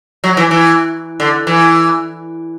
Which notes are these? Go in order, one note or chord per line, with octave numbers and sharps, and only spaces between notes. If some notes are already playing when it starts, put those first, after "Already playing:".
F#3
E3
E3
D3
E3